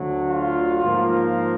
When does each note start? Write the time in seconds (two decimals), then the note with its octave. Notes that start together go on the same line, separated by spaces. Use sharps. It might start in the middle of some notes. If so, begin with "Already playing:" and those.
Already playing: D2 D3 F#3
0.29 F4
0.83 G#2 F3 A#3